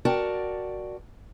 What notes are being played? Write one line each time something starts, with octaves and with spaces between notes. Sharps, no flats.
F#4 A#4 D5 G5 A5